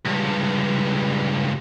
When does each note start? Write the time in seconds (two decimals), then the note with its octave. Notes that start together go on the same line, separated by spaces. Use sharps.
0.06 C#2 G2